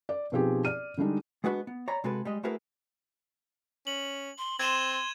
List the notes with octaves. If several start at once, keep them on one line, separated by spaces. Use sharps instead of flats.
D5
B2 F3 C4 D#4 G4 G#4
D5 F6 D#7
D3 G3 G#3 D4 D#4
G#3 B3 D4 F#4 G#4 B4
B3
C#5 D5 A#5 B5
C3 G#3 F#4 A4 B4
G3 G#3 D#5
A3 E4 F#4 G#4 A#4 B4
C#4 F#7
C6
C4 C6 G#6 D#7 E7